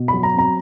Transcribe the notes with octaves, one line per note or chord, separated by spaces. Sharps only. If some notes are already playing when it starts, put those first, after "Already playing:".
Already playing: B2
F#3 B5
A#5
C4 A#5